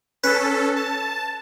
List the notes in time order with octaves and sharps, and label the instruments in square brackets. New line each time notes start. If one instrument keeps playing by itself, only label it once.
[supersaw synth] C#4 A4 [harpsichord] B4
[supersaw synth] A5